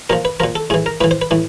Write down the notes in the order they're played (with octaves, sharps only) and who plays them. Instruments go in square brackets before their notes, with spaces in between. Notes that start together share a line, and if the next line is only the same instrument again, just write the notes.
[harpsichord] A#2 F3 A#4
B4
A#2 F3 A#4
A4
A2 E3 G#4
A#4
A2 B4
E3
C5
B4
A2 E3